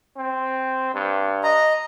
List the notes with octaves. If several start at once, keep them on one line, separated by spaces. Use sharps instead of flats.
C4
G2
D#5 A#5